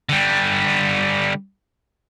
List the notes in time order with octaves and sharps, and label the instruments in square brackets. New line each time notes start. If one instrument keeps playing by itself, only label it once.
[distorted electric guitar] D3 G3